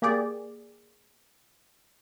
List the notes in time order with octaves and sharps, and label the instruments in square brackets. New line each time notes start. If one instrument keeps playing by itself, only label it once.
[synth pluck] A#3 G4 G#4 D5